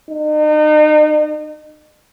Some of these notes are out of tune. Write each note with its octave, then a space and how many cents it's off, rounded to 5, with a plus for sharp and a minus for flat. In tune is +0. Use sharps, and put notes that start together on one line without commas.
D#4 -35